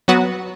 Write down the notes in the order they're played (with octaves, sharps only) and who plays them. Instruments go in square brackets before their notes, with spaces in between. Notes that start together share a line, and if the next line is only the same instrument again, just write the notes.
[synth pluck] F#3 B3 F#4